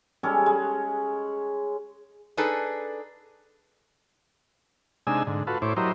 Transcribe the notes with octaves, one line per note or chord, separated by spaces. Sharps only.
G3 G#3 C#4 A4
G#3
D4 D#4 G#4 A4 B4
C3 G#3 D4 D#4 G#5 E6
G#2 D3
F4 F#4 A4 B4
A2 E4 C5 C#5 D6
F#3 E4 G4 A#4 C5 D#5